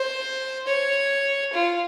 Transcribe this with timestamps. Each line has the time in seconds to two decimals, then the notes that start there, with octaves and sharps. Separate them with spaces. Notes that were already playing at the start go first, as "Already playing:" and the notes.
Already playing: C5
0.67 C#5
1.53 F4